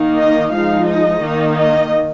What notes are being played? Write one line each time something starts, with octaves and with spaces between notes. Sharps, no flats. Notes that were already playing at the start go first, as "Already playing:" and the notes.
Already playing: D#3 A#3 D#4
D#5
F3 G#3 D#4 F5
D#5
D#3 A#3 D#4
D#5